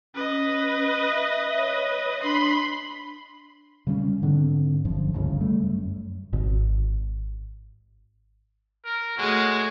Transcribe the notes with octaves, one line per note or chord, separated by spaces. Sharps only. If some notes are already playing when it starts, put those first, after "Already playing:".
C#4 B4 D#5
E5
C#5
D4 B5 C6
C#3 G3 B3 C#4
G#2 D3 C4 D4
G1 F#2 F3
G1 C#2 C#3
G3 A3
F#2
G#1
A#4
G#3 A3 F#4 G#4 C#5